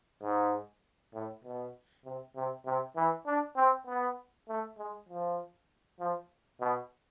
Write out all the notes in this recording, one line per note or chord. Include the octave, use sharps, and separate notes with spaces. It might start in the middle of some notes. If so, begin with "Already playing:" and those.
G#2
A2
B2
C3
C3
C3
E3
D4
C4
B3
A3
G#3
F3
F3
B2